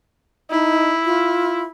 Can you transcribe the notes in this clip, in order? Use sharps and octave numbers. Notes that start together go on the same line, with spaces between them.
D#4 E4
F4